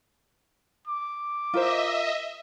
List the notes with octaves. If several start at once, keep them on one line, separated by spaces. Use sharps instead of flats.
D6
F4 A#4 C5 D#5 E5